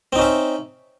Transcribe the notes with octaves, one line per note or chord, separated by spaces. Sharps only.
C4 C#4 D#4 E5